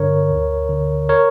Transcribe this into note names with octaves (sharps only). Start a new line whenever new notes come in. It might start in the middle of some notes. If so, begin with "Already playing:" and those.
Already playing: G2 D3 A#4 C#5
D2
D3
A#4 C#5